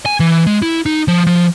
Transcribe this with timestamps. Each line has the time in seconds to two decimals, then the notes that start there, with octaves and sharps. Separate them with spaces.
0.06 G#5
0.20 E3
0.47 G#3
0.62 E4
0.86 D#4
1.08 F3
1.27 F3